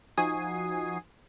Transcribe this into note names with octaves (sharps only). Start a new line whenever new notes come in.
F3 D#4 F#4 G#5 D#6 C7